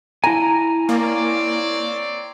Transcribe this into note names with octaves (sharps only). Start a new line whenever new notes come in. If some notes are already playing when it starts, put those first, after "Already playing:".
E4 G#5 A#5
A#3 C4 C#5 D5